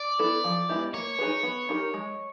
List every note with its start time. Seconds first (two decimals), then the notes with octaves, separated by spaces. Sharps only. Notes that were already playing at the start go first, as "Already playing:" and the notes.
Already playing: D5
0.19 B3 E4 A4
0.44 F3
0.69 G#3 B3 E4 G4
0.94 A#3 C#5
1.19 D#4 G#4 B4
1.43 B3
1.69 D#4 G4 A#4
1.94 G#3